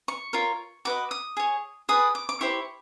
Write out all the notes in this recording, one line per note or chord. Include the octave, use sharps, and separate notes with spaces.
C#6
F4 A#4 C#5
F#4 B4 D#5 D6
D#6
G#4 C#5
G#4 B4 D5 D#6
D6
D6
E4 G4 C5 C#6